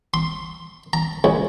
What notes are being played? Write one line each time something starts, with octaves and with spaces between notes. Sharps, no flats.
C6
A#5
C#2